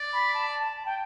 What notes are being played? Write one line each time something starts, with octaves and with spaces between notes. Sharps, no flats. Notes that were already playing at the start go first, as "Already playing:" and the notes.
Already playing: D5
B5
A5
A5
A5
G5